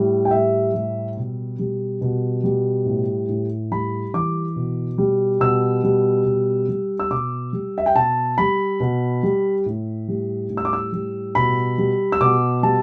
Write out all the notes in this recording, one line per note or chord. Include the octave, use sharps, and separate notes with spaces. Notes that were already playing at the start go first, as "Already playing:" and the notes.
Already playing: A2 G3
G5
A2 E5
G3
B2
G3
B2
G3
A2
A2
G3 B5
E3 D6
B2
G3
B2 E6
G3
B2
G3
E6
B2 D6
G3
E5
G5
B2 A5
G3 B5
B2
G3
A2
G3
A2
E6
D6
E6
G3
B2 B5
G3
E6
B2 D6
G3 A5